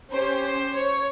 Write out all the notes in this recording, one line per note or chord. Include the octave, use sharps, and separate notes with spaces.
C#4 G4 C5
C5
C#5